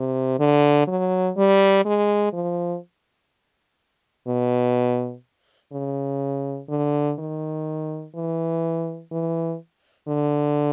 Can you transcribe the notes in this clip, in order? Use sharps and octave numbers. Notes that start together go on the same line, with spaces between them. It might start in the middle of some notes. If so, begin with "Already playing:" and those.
Already playing: C3
D3
F#3
G3
G#3
F3
B2
C#3
D3
D#3
E3
E3
D3